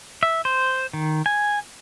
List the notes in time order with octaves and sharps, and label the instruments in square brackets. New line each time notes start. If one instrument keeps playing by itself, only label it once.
[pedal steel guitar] E5
C5
D#3
G#5